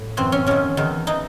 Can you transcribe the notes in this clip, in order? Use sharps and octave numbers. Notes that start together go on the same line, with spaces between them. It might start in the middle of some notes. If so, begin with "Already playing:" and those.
Already playing: A2
F#2 E3 C4
C#4
E2 D#3 C#4
E2 D#3
E3 D#4